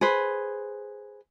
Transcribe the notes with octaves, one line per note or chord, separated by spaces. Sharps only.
G#4 B4 C5